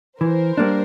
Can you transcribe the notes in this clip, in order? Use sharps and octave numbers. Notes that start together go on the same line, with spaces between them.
E3 A#4 C5
G3 A#3 D4